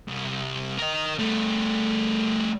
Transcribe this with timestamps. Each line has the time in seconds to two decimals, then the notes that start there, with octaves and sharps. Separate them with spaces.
0.08 C2
0.78 A#4 D#5
1.18 G3 A3